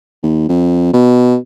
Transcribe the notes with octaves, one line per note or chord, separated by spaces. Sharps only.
D#2
F2
B2